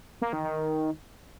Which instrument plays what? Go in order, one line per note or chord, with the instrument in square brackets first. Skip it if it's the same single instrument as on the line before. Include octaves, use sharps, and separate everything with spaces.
[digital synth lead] A#3
D#3
D#3